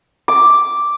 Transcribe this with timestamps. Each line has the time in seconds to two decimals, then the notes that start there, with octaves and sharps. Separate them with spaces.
0.28 D6